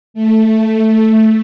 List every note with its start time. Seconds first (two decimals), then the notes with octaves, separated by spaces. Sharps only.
0.14 A3